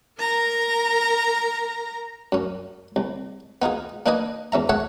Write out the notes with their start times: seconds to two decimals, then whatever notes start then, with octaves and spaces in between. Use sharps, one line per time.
0.19 A#4 A#5
2.32 F#2 C#4
2.96 C2
3.62 B3 D#4 F4 G#4
4.06 A#3 D4 D#4 B4 D#5 G#5
4.52 E2 C#4 E5 A#5
4.69 G#4 A4 C#5 E5 F#5